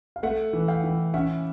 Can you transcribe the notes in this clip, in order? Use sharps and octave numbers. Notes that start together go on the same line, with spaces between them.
F5
A3 E5 F#5
E3
F5 G5
E3
C#4 E5 F#5